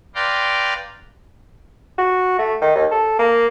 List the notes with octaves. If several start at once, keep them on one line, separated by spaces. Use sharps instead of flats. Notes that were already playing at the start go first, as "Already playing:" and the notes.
B4 D5 F5 G5 A#5 C6
F#4
A3
D#3
D#2
A4
A#3